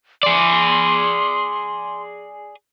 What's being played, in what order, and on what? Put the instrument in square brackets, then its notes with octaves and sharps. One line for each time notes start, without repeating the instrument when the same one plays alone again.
[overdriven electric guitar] G#4 D5 [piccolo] C6